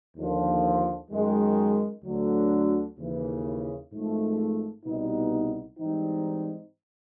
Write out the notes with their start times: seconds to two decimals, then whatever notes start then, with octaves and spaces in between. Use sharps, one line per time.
0.17 D#2 D3 F3
1.11 F#2 D#3 G#3
2.04 D2 D3 F#3
2.98 D#2 C#3 E3
3.92 G#1 G#2 F3 A3
4.85 C2 B2 G3 B3 D#4
5.78 G#2 E3 G3 C4 D#4